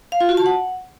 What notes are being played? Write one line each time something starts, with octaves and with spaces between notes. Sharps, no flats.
F5
F4
F#4
A5
F#5